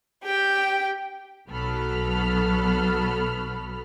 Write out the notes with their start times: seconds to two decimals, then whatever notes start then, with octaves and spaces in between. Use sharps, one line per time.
0.25 G4 G5
1.48 B1 F#3 B3 A4 B5 F6